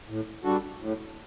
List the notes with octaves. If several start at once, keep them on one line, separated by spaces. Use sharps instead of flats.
A2
G3 D4 F#4 A4
A2